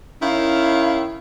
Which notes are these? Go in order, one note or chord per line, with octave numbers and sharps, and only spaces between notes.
D#3 C#4 E4 F5